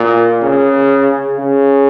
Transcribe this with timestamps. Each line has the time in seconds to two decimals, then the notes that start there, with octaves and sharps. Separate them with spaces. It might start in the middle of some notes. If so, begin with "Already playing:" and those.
Already playing: A#2
0.42 C#3
1.39 C#3